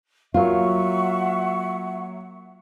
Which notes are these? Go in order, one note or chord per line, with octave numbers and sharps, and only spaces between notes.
F#3 A#3 F4 E5 F#5 C#6